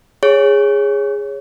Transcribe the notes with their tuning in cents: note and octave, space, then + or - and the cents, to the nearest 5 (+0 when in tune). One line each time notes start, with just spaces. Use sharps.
G#4 -10 C#5 +0